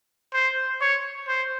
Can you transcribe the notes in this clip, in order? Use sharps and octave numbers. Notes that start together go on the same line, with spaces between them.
C5
C#5
C5